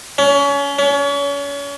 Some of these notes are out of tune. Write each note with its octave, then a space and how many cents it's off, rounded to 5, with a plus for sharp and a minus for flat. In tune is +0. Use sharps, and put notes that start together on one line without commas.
C#4 +30
C#4 +35